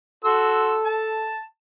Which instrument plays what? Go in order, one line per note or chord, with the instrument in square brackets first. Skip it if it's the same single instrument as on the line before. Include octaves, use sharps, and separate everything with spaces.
[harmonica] F#4 C6 E6 [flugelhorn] A4
[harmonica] A5